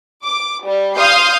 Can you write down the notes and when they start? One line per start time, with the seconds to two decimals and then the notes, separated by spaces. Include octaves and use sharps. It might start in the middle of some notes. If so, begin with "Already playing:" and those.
0.24 D6
0.66 G3
0.98 F5 C6 D#6 F6 G6 C7